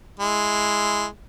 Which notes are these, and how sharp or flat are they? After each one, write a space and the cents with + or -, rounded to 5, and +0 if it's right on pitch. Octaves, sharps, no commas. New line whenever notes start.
G#3 +0 E4 +0